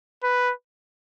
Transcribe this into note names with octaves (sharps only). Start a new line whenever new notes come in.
B4